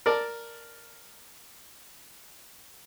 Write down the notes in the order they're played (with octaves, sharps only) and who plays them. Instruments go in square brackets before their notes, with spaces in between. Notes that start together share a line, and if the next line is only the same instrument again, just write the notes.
[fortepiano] A#4 D5 A5